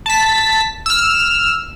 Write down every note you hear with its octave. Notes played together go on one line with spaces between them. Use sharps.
A5 B6
E6 F6